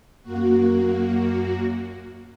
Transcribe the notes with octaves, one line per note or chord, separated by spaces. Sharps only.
F#2 A#3 F#4